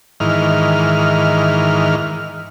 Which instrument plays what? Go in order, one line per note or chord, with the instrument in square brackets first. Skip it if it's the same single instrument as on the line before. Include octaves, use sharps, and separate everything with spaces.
[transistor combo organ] G#2 D#3 E3 F6